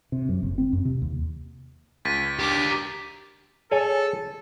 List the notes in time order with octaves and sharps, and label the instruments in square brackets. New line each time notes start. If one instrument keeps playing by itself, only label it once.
[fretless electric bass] C3
F#2
F#1
C4
F#2
C3
D#2
[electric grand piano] C#2 [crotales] A6 B6 D#7
[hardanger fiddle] D4 D6 [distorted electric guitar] G4 A#4
[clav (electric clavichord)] G#4 C#5 G#5 [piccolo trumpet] A4